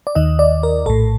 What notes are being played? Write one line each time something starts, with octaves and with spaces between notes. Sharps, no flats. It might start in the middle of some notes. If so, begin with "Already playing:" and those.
D5
D#2 D#3 D#5
D5
A#4
A#1 A2 A4